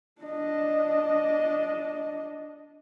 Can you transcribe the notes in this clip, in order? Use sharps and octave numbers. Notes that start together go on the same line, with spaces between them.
D4 D#5